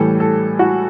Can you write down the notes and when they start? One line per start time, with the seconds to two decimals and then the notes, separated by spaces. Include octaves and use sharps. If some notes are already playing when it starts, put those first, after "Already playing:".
Already playing: A2 E3 G3 A4
0.20 A4
0.59 F#4